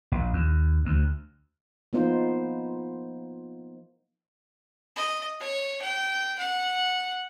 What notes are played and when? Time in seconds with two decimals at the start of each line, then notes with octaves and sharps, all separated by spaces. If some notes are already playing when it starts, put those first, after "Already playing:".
0.12 A#1
0.33 D#2
0.85 D2
1.93 F3 A#3 B3 D#4 F4 C5
4.96 D#5
5.40 C#5
5.81 G5
6.38 F#5